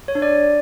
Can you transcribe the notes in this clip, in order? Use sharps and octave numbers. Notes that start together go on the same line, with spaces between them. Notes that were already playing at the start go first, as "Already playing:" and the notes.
C#5
D4
D5